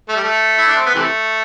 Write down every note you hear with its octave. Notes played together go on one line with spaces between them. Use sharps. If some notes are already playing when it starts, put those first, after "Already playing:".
A3
G3
A3
E4
D4
C4
B3
C3 E3 A3